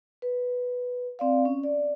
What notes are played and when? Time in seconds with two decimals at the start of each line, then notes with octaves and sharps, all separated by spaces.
0.22 B4
1.19 C4 D5 F5
1.45 C#4
1.63 D5